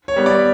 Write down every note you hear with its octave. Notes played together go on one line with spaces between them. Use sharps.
C#5
G3 B3
D5